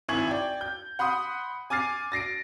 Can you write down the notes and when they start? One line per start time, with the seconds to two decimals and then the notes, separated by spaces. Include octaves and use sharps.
0.09 G#1 E4 G#5 C#6 G#6 F#7
0.27 D5 G5
0.61 G6
0.99 F#5 B5 C6 D#6
1.70 G#5 D6 F6 A6 C7
2.12 A6 A#6 C7 D7